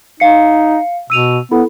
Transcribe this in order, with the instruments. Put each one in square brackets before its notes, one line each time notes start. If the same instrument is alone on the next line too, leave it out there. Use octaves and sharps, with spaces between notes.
[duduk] D#4 [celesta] F5 C7 C#7
[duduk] B2 [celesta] E6 D#7 F7
[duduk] B3 [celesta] E4 A4 B5